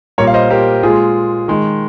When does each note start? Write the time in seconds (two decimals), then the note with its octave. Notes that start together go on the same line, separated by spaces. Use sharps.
0.18 A#2 G3 A#3 A#4 C#5
0.27 F5
0.34 C5 D#5
0.50 G4 A#4
0.83 A#2 G#3 F4 G#4
1.48 D#3 G#3